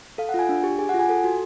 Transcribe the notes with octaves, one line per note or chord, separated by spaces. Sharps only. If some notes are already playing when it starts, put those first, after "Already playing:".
A4 F5
F#5
F4 G#5
D4
G4
G#4 G#5
F#5
F4
G#5
A4
F#4